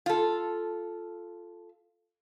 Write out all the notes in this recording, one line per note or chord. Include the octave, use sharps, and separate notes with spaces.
F4 A4